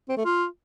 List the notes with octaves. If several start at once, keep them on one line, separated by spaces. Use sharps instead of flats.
C4
A3
F4